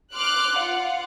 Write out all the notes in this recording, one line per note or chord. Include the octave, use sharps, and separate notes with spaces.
C6 D6 F6 F#6
F4 F5 F#5